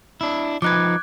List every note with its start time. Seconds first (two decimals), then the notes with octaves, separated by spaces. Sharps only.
0.21 D4 E4
0.62 F3 D#4 B4 D6 F#6 G#6